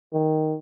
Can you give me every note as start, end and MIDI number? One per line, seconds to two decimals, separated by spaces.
0.13 0.56 51